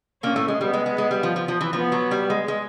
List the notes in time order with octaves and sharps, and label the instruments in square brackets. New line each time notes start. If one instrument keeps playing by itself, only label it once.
[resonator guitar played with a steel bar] A#2 A#3 [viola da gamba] C#4
[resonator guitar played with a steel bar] A2 A3
G#3
[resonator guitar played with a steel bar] G3 [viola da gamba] B3
[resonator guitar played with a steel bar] G#3
G#3
G#3
G3
F3
F3
F3
E3
[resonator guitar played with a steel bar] F3 [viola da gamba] B3
[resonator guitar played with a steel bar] F#3
G3
G#3
G#3